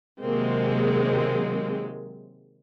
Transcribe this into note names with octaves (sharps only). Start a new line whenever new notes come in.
C3 D#3 F#3 G#3 A#3 C4